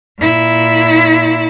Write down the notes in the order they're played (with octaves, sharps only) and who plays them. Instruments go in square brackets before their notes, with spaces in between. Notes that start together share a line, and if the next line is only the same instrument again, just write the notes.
[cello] A#2 E4